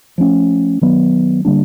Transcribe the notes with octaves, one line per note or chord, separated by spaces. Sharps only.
F3 A3 C#4
D#3 F#3 B3
D3 G3 A#3 D4